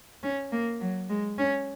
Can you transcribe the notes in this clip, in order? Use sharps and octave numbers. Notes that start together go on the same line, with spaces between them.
C#4
A#3
F#3
G#3
C#4